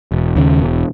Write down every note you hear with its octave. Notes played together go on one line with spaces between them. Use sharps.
E1
D#2 C#3
E1